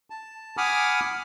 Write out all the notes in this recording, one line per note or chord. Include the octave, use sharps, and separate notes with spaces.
A5
F#5 G#5 B5 D6 D#6 F6